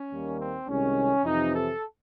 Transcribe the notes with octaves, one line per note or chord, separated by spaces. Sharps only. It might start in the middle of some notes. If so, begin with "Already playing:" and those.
Already playing: C#4
D#2 D#3 G3 A#3
C4
C2 C3 D#3 G#3 C#4
F2 C3 E3 D#4
A4